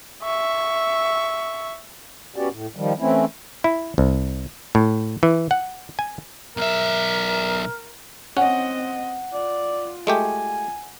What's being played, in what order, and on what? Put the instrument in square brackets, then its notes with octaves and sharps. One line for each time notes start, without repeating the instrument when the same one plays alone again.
[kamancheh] E5 C#6
[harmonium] B3 C#4 F#4 G4 D5
A2
D#3 F3 G3
E3 A3 C4 C#4 E4
[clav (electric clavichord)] E4
C2
A2
E3
F#5
G#5
[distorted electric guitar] B1 E5 [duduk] A#4
[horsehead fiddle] C4 D#5 [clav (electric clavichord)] C#4 [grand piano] F#5
[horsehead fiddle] F4 [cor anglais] D5
[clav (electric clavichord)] G#3 A3 G4 [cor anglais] G#5